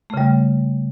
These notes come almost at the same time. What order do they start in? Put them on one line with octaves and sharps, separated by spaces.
A3 C#3 G3